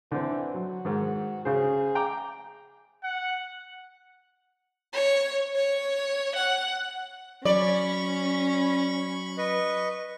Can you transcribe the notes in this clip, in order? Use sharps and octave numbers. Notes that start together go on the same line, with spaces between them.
D3 E3 C4
F#3 F#4
G#2 D#3
C#3 G#4 C5
G5 A#5 D6
F#5
C#5
C#5
F#5
F#3 C#4 D5 B5 C#6
B4 D#5 C#6